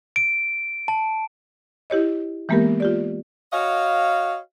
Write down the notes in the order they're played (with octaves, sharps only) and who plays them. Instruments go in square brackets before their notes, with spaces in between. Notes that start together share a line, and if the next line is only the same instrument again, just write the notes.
[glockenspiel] D7
A5
[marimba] E4 G4 C#5 D#5
E3 G#3 A#3 B3 G4 A#4
F4 G4 D5
[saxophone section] F#4 C#5 D#5 F5